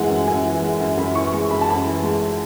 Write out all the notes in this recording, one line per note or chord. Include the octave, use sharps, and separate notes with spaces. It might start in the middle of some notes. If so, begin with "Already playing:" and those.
Already playing: F#2 E3 G#3 F#5 G#5
F#2
F#2 G#5
E3
G#3
F#2
F#2 B5
E3 C#6
G#3 C#6
F#2 B5
A5
F#2 B5
E3
G#3